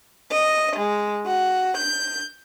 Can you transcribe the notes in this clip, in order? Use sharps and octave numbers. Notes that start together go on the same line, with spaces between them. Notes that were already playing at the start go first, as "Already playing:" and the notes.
D#5
G#3
F#4
G6